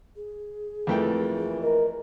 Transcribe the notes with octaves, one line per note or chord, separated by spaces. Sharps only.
G#4
F2 A#2 E3 A3 G5
A#4 D#5